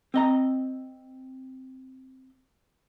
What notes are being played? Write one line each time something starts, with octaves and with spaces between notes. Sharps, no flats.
C4 D#5 A#5